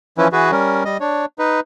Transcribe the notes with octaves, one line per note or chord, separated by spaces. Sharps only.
E3 F3 C#4 E4 B4
E3 F#4 G#4 B4
G3 C#4 A#4
G3 D#5
D4 C#5
D#4 B4